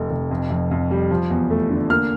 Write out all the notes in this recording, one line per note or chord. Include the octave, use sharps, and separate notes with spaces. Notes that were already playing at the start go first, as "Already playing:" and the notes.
Already playing: F1 F2 A3
F1
F2
F2
F2
G3
F3
E2
A3
D3
A#3 F6